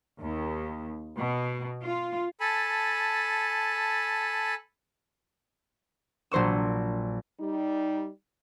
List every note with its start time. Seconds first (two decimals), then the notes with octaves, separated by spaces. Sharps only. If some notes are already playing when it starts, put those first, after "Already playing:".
0.21 D#2
1.17 B2
1.83 F4
2.41 A4 G#5 A5 B5
6.31 A#1 F#3 C5 C#6 E6
7.39 G3 D#4